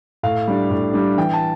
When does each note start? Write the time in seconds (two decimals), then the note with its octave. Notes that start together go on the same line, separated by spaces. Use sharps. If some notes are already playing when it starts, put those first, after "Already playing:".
0.23 A2 F5
0.48 G3 D4
0.70 A2
0.93 G3 D4
1.18 E3 G5
1.33 A5